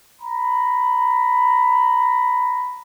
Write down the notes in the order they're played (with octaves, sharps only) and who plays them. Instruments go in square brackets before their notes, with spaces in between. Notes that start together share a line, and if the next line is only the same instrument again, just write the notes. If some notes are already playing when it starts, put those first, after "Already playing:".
[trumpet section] A#5 B5